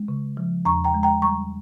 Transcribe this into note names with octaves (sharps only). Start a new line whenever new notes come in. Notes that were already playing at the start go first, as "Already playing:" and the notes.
Already playing: G#3
C#3
F3
E2 A#5 C#6
G5 A#5
G#3
G5 A#5
G3 A#5 C#6